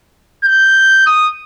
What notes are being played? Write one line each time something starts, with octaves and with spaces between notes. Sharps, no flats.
G6
D#6